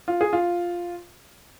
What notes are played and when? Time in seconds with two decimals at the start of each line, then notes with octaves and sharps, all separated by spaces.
0.08 F4
0.21 G#4
0.33 F4